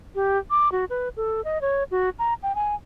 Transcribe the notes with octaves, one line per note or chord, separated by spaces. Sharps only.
G4
D6
F#4
B4
A4
D#5
C#5
F#4
A#5
G5
G#5